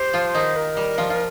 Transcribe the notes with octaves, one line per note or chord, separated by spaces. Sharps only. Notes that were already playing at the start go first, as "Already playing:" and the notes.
Already playing: G4 C5
F3 F4
D#3 D#4
A#4
G3
F3 F4
F4